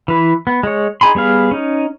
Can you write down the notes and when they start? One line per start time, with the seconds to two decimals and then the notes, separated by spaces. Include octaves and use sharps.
0.08 E3 B4
0.47 B3
0.63 G#3 C#5
1.01 D#4 G#4 G#5 B5 C6
1.15 G3 B3 G#4 F5
1.51 C#4 D#4